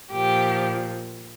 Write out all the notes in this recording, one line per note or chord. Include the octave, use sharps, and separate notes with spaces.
A#2 F3 G4